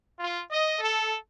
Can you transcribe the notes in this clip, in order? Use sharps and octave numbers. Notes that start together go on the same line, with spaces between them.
F4
D#5
A4